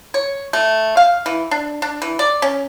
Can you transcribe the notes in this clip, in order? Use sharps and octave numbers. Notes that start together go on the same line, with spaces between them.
C#5
A3
F5
E3
D4
D4
E3
D5
C#4